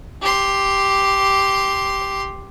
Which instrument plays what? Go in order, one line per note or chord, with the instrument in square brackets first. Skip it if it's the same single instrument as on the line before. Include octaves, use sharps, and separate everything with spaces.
[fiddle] G4 C6